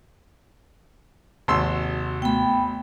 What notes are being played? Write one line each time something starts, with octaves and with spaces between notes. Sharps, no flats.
G#1 D#2 C3 F#4 C6 E6
A3 B3 G5 B5